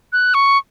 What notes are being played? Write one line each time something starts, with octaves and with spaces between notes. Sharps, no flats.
F#6
C#6